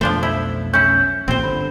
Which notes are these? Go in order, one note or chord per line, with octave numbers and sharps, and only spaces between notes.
B1 F2 F3 A3 D4 C5
E4
C#4 E4 G6
A#1 D#2 A#2 C4 C5
G1 D3 B5